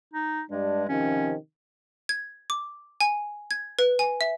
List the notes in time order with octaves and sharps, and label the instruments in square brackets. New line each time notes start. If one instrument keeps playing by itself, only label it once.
[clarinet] D#4
[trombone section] G2 D4 [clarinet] G#3
[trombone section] C3 D#3 F3 [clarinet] C#4
[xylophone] G#6
D6
G#5
G#6
B4
G#5
E5